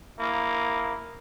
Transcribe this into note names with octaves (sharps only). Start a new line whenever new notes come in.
A#3 E4